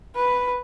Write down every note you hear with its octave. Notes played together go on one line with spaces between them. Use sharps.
B4